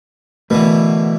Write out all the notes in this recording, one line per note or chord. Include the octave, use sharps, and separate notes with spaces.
B2 D3 E3 A3 A#4 B4